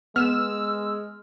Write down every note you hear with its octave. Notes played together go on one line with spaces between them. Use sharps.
G#3 B3 E6 F6 E7